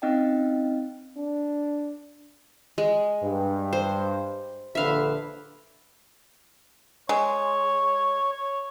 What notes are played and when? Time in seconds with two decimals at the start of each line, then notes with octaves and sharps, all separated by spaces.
0.02 C4 C#4 D#4 D#5 F5 G5
1.17 D4
2.78 G#3
3.22 G2
3.73 C5
4.75 A#1 D3 B4 E5 F5
7.09 G#3 C#5
8.32 C#5